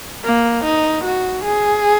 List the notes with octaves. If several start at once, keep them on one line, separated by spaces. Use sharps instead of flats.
A#3
D#4
F#4
G#4